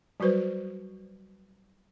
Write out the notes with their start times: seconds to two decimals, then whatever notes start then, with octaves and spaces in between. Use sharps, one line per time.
0.20 F#3 G3 F#4 B4 C5